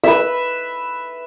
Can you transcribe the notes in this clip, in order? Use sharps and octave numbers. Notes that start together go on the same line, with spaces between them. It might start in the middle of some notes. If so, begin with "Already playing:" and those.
B4 E5